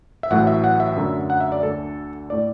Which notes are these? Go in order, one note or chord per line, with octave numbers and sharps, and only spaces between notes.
E5
A1 A2 F#3 A3 F#5
E5
F#5
E5
F#2 D3 F#3 A3
F#5
E5
D5
D2 D3 A3 A4
A2 A3 D5